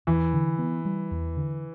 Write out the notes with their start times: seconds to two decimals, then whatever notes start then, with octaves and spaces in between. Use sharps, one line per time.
0.07 E2 E3
0.34 D3
0.59 B3
0.85 G3
1.11 E2
1.37 D3